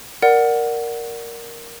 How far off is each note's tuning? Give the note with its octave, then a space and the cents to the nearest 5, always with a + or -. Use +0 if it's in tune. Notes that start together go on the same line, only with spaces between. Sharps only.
A#4 +0 D5 +0 F#5 +0